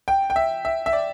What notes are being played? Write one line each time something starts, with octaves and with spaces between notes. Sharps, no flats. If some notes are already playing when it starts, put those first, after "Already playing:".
G5
G5
E5
E5
E5
D5